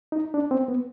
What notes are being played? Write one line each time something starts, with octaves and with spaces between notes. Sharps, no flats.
D#4
D4
C4
B3